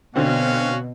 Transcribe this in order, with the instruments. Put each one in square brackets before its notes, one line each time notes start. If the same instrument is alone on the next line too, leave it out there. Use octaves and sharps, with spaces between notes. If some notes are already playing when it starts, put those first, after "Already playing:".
[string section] B2 [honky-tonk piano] D3 C4 [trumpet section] C#4 F#4 F5